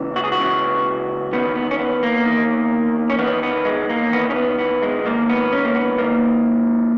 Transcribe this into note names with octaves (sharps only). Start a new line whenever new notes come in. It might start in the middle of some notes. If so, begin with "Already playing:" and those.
Already playing: C#2 C#3 E3
F#4
G#4
F#4
C#2 C#3 E3
E2 D#3 B3
B3
C#4
B3
A#3
E2 D#3
C#4
E2 D#3 B3
B3
G#3
A#3
E2 D#3 B3
C#4
B3
B3
G#3
G#2 D#3 A#3
B3
C#4
A#3
B3
G#2 D#3 A#3